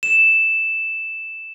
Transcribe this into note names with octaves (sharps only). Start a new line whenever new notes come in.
E7